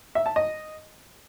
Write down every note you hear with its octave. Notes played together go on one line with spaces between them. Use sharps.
E5
A5
D#5